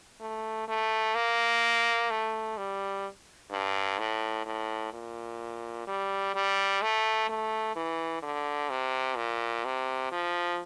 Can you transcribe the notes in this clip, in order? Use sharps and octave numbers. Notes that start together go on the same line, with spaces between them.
A3
A3
A#3
A3
G3
G2
A2
A2
A#2
G3
G3
A3
A3
E3
D3
C3
A#2
C3
F3